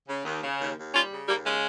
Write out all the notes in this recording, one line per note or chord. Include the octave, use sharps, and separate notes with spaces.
C#3
D#2
C#3
D#2
D#2
G3 C#4 F4
C#3
D#2 G3 A#3
C#3 G#3